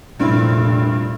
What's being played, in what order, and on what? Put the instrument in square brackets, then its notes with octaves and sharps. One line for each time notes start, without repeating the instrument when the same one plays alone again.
[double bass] F1 A#2 [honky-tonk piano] G2 C4 E4